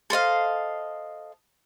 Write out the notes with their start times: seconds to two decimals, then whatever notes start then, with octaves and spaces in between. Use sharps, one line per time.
0.10 A4 C5 D#5 F5